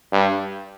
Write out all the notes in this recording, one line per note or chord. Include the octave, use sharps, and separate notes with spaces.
G2